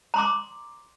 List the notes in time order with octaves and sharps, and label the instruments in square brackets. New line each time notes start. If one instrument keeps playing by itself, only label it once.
[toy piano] A#5 C6 D6